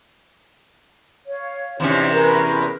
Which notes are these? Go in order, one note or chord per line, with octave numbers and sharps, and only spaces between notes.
C#5 F5
E2 C3 C#4 D#4
G#4 A#4 B4